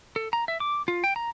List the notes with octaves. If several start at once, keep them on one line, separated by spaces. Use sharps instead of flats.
A4
A#5
E5
D6
F4
G5
A#5